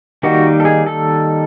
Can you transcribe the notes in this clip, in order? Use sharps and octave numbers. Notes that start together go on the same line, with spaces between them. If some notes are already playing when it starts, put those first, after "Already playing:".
D#3 G3 A#3 D#4 F#4
A4
G#4
A4